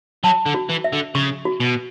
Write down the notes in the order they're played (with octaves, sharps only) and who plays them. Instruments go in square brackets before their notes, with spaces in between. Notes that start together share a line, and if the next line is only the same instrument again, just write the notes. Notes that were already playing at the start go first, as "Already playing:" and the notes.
[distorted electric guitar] F#3 [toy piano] A5
[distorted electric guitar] D3
[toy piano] F#4
[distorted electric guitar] E3
[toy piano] E5
[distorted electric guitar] D3
[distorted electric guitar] C#3 [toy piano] C#6
[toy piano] F#4
[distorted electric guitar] B2